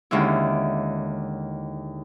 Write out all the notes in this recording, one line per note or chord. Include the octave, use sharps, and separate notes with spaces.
D#2 D3 G#3 C#4 E4